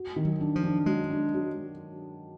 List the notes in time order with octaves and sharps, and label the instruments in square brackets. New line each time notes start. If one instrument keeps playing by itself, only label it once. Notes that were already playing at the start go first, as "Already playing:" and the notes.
Already playing: [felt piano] F#4
D#3
[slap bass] F#3
[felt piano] D4
[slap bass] F3
[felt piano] D4
[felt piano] F#3 [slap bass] G#3
[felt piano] D4
F#3